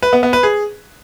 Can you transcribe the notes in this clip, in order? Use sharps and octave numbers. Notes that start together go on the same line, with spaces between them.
B4
B3
B3
B4
G#4